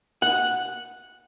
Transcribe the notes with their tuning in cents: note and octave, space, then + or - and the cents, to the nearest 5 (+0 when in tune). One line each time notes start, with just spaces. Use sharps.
F#5 -10